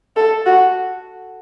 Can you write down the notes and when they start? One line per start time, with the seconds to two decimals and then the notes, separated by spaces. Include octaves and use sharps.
0.16 A4
0.46 F#4